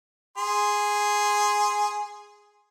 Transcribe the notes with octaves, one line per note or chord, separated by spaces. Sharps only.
G#4 C6